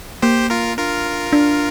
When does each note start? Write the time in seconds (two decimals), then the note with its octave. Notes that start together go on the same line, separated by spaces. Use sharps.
0.22 A#3 G4 C5
0.50 F4 A#4
0.77 D4 F4 A#4
1.33 D4